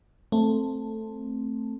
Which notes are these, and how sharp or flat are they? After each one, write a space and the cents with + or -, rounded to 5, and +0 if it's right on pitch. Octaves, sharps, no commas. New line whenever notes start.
A3 +5 C4 +5